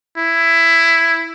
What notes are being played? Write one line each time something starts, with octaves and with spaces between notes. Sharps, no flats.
E4